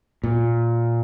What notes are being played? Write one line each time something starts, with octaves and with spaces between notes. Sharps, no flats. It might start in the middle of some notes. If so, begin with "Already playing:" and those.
A#2